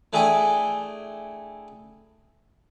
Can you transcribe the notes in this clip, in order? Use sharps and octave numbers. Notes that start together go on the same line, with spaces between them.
A3 D4 E4 G#4 G5 G#5